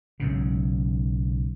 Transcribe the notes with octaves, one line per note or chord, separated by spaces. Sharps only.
B1 G#2 C#3